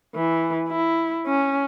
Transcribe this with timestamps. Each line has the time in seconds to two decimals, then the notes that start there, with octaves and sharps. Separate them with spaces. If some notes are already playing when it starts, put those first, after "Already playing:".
0.15 E3
0.68 E4
1.26 C#4